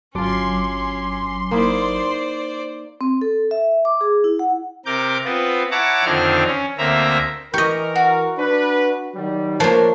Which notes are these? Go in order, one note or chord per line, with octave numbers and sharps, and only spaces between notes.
G1 F#3 C#4 D4 F4 C6 D6
A#3 D#4 E4 C5 D5
C4
A4
E5
D6
G#4
E4
F#5
C3 A#4 D6 G6
B3 C4 F4 B4
E4 C#5 F#5 A5 A#5 D6
F2 D3 D#3 C4 D4 F6
C#4
D2 A#3 C4 E5 A#5
E3 G4 A#4 D#5 C#6
F#4
D4 B4
D#3 F#3 G3
F3 A#3 D4 A#4 C#5